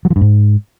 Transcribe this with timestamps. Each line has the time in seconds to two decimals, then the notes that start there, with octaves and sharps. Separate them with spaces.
0.05 F#3
0.10 F3
0.16 G2
0.21 G#2